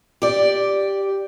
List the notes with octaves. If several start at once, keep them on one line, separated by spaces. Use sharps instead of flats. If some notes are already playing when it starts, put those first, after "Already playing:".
G4 D5